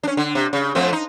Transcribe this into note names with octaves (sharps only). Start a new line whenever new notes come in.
C#4 D4
D3
C3
C#3
F2 A3 C4
D#4